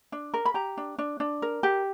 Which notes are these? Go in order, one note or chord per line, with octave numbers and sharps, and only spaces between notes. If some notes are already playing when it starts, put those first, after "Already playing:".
D4
A#4
B5
G4 A#5
D4
D4
D4
A#4
G4